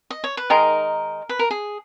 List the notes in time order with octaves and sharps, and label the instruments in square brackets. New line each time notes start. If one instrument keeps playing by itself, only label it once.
[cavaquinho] D#5
C#5
B4
[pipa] D#3 G#3 D#4 [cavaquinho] A#4
[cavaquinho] B4
A#4
G#4